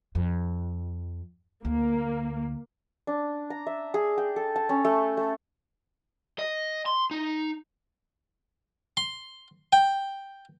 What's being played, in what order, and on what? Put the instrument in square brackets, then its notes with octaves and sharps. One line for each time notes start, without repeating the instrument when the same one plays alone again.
[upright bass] F2
[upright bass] D2 [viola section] A#3
[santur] D4
A#5
E5
G#4
G5
A4
A5
C#4
A3
A3
[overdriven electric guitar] D#5
C6
D#4
[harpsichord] C6
G5